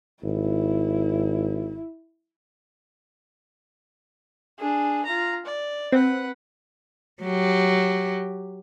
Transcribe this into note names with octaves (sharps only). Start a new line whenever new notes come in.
G#1 E4
D4 G#4
F4 A#5
D5
C4 B4 F#5
F#3 G4